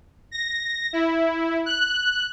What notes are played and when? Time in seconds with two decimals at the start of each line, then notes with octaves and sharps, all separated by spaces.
0.31 A#6
0.93 E4
1.66 F#6